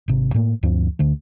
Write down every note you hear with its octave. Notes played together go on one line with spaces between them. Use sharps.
G#1 C3
A2 A3 A#3
D2 G2 F3 C4
D2 D3 A3